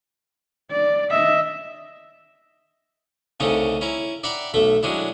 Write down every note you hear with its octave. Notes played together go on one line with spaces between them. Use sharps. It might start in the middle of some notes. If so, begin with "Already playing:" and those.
D5
D#5 E5
C2 C#3 A3 C#4 D#4 C5
C#4 E4 A#5
D5 E5 F#5 G5 A#5 B5
B1 A3 A4 E5
F#3 G#3 C#4 D4 E4